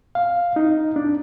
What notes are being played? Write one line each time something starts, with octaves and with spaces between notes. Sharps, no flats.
F5
D#4
D4